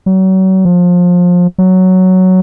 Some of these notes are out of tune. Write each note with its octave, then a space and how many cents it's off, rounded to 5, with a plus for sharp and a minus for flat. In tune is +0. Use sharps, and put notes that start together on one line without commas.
F#3 +35
F3 +25
F#3 +5